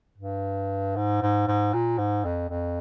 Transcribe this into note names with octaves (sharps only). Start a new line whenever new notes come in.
G2
G#2
G#2
G#2
A#2
G#2
F2
F2